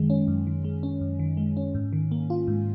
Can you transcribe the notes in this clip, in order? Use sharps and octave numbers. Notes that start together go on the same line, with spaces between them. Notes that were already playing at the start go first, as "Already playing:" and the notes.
Already playing: F#2 D#3 G#3
C#4
F#2
D#3
G#3
C#4
F#2
D#3
G#3
C#4
G#2
D#3
A#3
F4
G#2